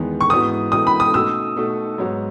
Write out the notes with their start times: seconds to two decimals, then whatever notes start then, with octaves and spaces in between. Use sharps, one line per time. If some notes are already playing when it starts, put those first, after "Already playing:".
Already playing: E2 D#3 G#3 B3
0.21 C#6
0.30 G#2 E3 B3 F#4 D#6
0.72 G#2 E3 B3 F#4 D#6
0.87 B5
1.00 D#6
1.14 B2 A3 D#4 F#4 A4 E6
1.56 B2 A3 D#4 F#4 A4
1.98 G#2 F#3 B3 F#4